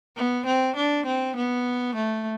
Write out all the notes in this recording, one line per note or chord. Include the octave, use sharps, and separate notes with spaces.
B3
C4
D4
C4
B3
A3